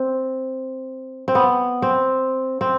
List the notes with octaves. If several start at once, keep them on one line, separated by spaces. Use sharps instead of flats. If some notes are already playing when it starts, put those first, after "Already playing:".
Already playing: C4
C4
B3
C4
C4